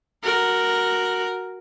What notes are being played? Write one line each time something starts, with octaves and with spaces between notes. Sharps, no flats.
F#4 A#4